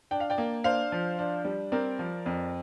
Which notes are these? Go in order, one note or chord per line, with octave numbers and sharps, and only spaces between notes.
D4 G5
F5
D5 G5
A#3
D4 C5 F5
F3
D4
G3
C4 A#4 D5
F3
F2